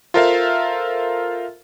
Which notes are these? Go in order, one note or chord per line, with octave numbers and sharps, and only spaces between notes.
F4 A4 A#4 C5 E5 F5